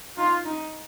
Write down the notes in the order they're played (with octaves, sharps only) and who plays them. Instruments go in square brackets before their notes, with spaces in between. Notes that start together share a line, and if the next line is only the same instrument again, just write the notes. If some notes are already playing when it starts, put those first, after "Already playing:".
[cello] D#4 [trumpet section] F4
[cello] D#4